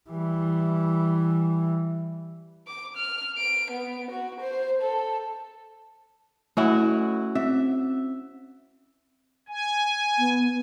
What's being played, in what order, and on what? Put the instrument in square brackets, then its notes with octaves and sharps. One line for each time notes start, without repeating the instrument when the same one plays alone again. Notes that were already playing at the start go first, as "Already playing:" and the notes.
[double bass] E3 G3
[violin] D6
F6
D7
B3
F#4
C5
A4
[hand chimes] A3 [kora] C#4 E4 F#4
[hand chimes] C4 [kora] E5
[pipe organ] G#5
[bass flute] B3